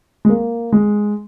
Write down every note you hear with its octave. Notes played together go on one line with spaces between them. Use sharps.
G#3
A#3
G#3